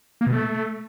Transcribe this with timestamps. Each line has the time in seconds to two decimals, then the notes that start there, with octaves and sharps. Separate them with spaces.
0.21 A#3
0.27 B2
0.32 A3